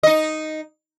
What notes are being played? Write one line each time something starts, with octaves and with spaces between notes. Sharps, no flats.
D#4 D#5